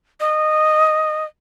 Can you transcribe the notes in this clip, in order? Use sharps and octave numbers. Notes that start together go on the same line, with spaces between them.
D#5